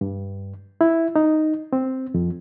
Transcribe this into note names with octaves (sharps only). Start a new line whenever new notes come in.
G2
E4
D#4
C4
F2